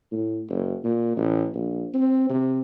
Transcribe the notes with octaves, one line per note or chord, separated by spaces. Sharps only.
A2
F#1
A#2
A1
A#1
C4
C3